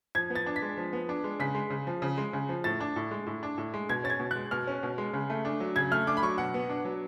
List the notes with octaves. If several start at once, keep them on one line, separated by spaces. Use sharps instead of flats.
F3 G#6
B3
A6
D4
B6
G#3
F3
B3
D4
G#3
C#3 B6
G#3
C#3
F3
C#3
G#3
C#3
F3
A2 A6
D4
A2
G#3
A2
D4
A2
G#3
B2 G#6
C#4 A6
G#6
B2
G#3 F#6
B2 F6
C#4
B2
G#3
C#3
A3
D4
F#3
C#3 G#6
A3 F6
D4 D6
B5
F#3 C#6
B2 F#5
B3
D4
F#3